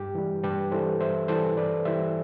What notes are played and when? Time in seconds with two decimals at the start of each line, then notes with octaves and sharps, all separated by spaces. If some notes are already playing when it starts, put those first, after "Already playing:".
Already playing: G2 G4
0.15 E3 G3
0.43 G2 G4 B4
0.72 E3 G3 A4 C5
1.01 G2 C5 E5
1.28 E3 G3 A4 C5
1.57 G2 B4 D5
1.85 E3 G3 C5 E5